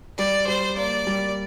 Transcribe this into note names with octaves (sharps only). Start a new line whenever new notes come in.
G3 D5
G3 C5
A#3 D5
G3